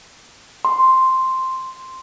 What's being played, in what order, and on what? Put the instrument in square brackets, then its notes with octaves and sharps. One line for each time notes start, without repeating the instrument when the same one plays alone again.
[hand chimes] C6